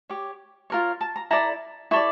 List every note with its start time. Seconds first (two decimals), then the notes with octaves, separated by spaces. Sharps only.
0.09 G4 C#5
0.70 F4 A#4 C#5
1.01 A5
1.16 A#5
1.31 E4 A4 D5 A#5
1.91 E4 A4 D5 C#6